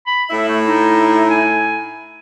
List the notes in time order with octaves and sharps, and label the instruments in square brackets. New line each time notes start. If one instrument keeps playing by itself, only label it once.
[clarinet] B5
[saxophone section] A2 E4 [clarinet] E5
[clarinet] A3
D#4
G#5